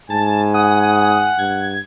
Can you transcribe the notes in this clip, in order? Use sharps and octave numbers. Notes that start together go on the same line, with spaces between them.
G#2 G#5 A5
F#5 D#6
G2 G#6